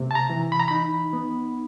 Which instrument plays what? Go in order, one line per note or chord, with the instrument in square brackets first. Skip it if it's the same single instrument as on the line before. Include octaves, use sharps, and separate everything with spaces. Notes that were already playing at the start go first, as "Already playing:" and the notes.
Already playing: [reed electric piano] C3 A3
A5
A#5
E3
B5
A#5
D#4 B5
B3